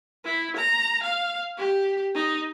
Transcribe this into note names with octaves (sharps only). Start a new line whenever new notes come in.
E4
A#5
F5
G4
D#4